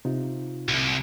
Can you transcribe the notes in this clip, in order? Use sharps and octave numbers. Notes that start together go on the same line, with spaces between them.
C3 D#4 F4
C2